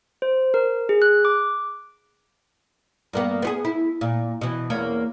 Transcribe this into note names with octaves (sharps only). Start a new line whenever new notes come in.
C5
A#4
G#4
F#6
D6
G2 A#3 B3
B3 F4 G#4
E4
A#2
B2 E3
E2 A#3 C#4